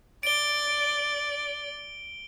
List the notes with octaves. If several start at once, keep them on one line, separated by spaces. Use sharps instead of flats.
D5 D7 G7